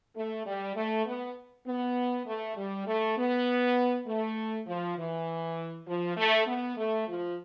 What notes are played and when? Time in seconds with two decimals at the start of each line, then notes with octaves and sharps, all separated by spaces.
0.16 A3
0.46 G3
0.76 A3
1.07 B3
1.67 B3
2.27 A3
2.57 G3
2.87 A3
3.18 B3
4.07 A3
4.67 F3
4.98 E3
5.87 F3
6.17 A3
6.47 B3
6.78 A3
7.08 F3